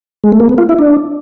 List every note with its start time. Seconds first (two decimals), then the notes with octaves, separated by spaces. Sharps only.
0.24 G#3
0.32 A3
0.40 A#3
0.49 B3
0.58 F4
0.69 E4
0.79 D4